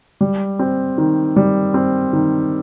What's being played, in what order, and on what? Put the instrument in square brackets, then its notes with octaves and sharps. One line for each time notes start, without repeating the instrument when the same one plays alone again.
[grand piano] G3
C4
D#3
G3
C4
D#3